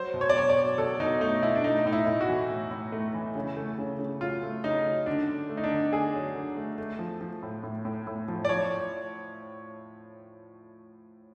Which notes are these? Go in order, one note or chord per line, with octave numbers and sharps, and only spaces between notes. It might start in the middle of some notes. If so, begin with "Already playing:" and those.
Already playing: F#3 C5
B2
C#5
D5
F#3 C#5
D5
F#3
B2 A4
B2 D#4
A3 D#4
B2 E4
D4
A3 D#4
A2 D#4
E4
A2
F#4
E3
A2
A2
A3
E3
C#3
A3
C#3
C#3
F#3 F4
A3
C#3 D#4
F#3
D3 D4
D3
A3
D#4
D4
D3
D3 G#4
F#3
D3
A3
A3
F3
F3
A2
A2
A2
A2
F3
D5
F3 C#5